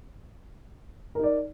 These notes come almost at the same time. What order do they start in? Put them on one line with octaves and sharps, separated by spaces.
A#4 D#4 D5